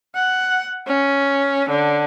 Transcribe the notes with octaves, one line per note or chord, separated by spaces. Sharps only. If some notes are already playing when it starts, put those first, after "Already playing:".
F#5
C#4
D3